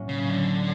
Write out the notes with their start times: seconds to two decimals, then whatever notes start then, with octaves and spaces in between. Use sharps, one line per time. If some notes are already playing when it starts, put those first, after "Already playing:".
Already playing: A2 F#3 A#3 C#4
0.09 C#3
0.29 D3